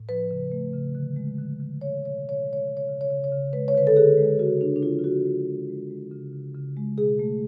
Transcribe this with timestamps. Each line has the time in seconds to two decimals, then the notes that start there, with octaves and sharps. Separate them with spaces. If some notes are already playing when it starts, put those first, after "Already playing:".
Already playing: A2
0.09 F3 B4
0.31 C#3
0.52 A3
0.73 C#3
0.95 D3
1.16 G#3
1.38 D3
1.60 D3
1.81 G#3 C#5
2.03 B2 C#5
2.24 B2 C#5
2.46 G#3
2.53 C#5
2.68 C#3
2.77 C#5
2.89 C#3
3.01 C#5
3.10 C#3
3.24 C#5
3.32 C#3
3.53 G#3 B4
3.68 C#5
3.75 D3 B4
3.87 A4
3.97 D3 G#4
4.18 G#3
4.39 C#3 F#4
4.61 C#3 D4
4.76 D4
4.83 F3 F4
4.99 F4
5.04 C#3 F#4
5.26 G#3
5.47 G#3
5.69 G#3
5.90 G#3
6.11 C#3
6.33 C#3
6.54 C#3
6.77 G#3
6.98 B2 G#4
7.19 A3